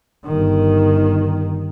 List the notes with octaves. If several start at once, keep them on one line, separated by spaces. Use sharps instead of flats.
G1 D#3